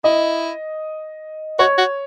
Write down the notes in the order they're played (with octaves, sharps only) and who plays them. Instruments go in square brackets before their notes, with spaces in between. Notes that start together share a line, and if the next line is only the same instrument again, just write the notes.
[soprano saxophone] E4 [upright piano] D#5
[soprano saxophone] F#4 [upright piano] C#5
[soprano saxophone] F#4